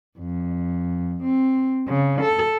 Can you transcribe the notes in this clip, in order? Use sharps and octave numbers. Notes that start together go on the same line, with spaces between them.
F2
C4
C#3
A4